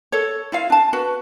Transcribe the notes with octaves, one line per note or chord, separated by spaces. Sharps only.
A4 C#5
E4 F4 F5
D4 A5
F#4 B4